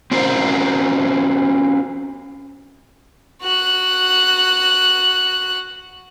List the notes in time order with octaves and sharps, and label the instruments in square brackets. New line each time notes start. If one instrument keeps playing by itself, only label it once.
[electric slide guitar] C4 C#4 F#4 A#4 C5
[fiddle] F#4 F#6